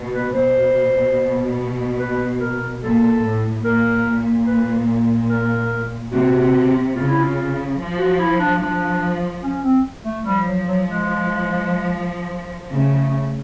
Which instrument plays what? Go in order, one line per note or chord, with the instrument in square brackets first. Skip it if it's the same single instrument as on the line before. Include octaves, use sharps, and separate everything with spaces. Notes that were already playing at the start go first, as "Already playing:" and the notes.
Already playing: [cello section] B2
[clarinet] B4
[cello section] B2 [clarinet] C5
[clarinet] B4
A#4
[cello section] A#2 [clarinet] A4
[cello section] A2
[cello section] A#2 [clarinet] A#4
[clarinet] B4
A#4
[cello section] C3 [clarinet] F#4
[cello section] C#3 [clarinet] F4
[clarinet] E4
F4
[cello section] F3
[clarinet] F#4
E4
D4
[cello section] F3 [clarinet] D4
[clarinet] C#4
C4
A3
[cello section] F3 [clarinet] G3
[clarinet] F#3
F#3
G#3
[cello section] C#3 [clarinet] A3